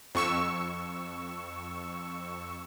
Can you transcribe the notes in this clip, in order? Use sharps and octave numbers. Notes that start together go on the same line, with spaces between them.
F2 C#6 E6